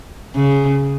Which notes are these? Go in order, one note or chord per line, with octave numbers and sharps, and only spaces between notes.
C#3